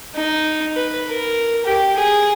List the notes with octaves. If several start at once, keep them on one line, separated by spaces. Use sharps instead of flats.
D#4
B4
A#4
G4
G#4